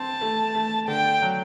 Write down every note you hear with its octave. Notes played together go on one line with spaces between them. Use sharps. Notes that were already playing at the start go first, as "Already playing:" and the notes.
Already playing: C4 A5
A3
A3
D3 G5
F#3